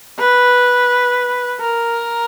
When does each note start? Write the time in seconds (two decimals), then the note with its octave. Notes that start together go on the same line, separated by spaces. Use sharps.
0.19 B4
1.61 A#4